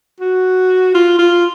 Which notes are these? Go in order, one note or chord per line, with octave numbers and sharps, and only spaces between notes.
F#4
F4
F4